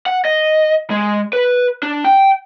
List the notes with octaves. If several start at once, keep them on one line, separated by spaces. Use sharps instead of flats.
F#5
D#5
G#3
B4
D4
G5